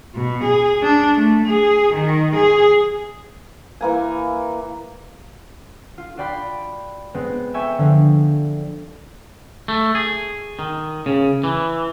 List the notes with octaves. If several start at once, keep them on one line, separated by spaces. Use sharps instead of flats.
B2
G#4
D4
A3
G#4
D#3
G#4
E3 A#3 G#5
F4
F4 F#4 D5 G5 B5 C6
G#3 B3 C4
E5 G5 G#5 C#6
D3 F3
A3
G#4
D#3
C#3
E3